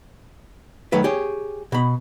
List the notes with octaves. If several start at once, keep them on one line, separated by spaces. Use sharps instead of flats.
D#3 F#3 A3 B4
G4 G#4 C#5
B2 B5